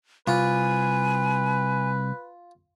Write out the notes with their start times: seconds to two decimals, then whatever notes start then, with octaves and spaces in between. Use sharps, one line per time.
0.27 C2 F4 B4 G#5